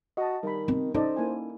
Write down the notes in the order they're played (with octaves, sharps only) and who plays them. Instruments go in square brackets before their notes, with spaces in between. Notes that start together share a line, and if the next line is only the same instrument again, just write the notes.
[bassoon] F#4 [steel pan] D#5 A5
[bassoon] D#3 [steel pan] G3 B5
[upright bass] C4
[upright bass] C#4 D#4 [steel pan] A4 D5 D#5 [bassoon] C5
[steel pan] A#3 E4 G#5